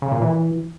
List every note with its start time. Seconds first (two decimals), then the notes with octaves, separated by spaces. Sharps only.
0.02 C#3
0.12 A#2
0.22 E3